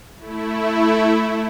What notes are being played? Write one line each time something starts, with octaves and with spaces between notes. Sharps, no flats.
A3 E4